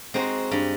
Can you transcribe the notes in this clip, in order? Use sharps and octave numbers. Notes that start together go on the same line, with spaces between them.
G#3 C4 D#4 F#4
G2